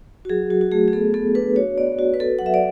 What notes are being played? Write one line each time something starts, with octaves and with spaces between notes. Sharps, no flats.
F#4
F#3 G#4
F#3 F#4
F#4
A3 G#4
G#4
B3 A4
B3 A4
D4 B4
F#4 C#5
B3 D5
F#4
B4
F#4 A4
F#3 F#5
E5
D5